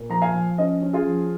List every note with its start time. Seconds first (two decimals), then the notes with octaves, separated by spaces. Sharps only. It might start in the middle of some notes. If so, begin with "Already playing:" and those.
Already playing: A#2
0.09 F3 A#5
0.22 F5 G#5
0.33 F3
0.58 C#4 C5 D#5
0.81 C#4
0.93 F4 G#4
1.07 F3